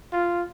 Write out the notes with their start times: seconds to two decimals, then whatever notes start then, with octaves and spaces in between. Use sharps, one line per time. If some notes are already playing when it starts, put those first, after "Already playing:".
0.12 F4